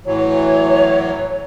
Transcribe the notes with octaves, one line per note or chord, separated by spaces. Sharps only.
A2 E3 F#3 C#5